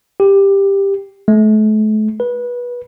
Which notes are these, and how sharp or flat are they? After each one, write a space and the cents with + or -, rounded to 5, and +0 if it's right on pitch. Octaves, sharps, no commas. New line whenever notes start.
G4 +10
A3 -40
B4 -20